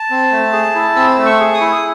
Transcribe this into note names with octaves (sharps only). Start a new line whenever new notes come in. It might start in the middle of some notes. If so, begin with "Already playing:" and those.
Already playing: A5
C4
A3
G#4
E4
C4 E6
A3
C#6
G#4
D#6
E4